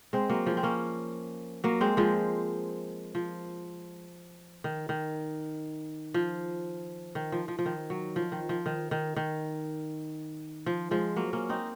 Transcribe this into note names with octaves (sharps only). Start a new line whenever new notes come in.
G#3 C4
F#3 A#3
F3 G#3
C4
A#3 C#4
F#3 A#3
G#3 C4
F3 G#3
F3
D#3
D#3
F3
D#3
F3
F3
F3
D#3
F#3
F3
D#3
F3
D#3
D#3
D#3
F3
F3 G#3
F#3 A#3
A#3 C#4
C4 D#4